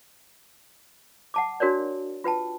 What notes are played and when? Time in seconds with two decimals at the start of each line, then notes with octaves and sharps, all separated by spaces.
1.34 F#5 A5 D6
1.60 D4 F#4 A#4 C#5 D5
2.24 F4 B4 G5 A5